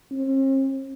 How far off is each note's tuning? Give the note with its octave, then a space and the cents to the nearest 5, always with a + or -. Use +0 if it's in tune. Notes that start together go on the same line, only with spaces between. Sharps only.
C4 +45